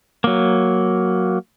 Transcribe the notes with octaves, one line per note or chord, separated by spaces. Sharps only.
F#3 A#3